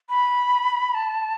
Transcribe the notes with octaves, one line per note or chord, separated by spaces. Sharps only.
B5
A5